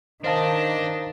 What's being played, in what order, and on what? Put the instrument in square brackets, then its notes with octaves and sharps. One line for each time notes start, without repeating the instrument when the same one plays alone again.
[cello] D#3 [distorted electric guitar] D4 [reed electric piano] C5 F5 A5 [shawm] D#5